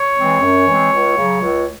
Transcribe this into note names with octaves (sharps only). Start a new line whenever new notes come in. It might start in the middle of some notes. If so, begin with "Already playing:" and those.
Already playing: C#5
E3 G#3 C4
F#2
E3 G#3 C4
C#2
C#3 F#3
C#2